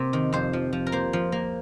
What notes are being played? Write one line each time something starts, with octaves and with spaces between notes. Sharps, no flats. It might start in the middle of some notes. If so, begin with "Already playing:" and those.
Already playing: C3 A#3
D#3
F2 C5
F3
F3
A#4
A#3 C5
F3
A#3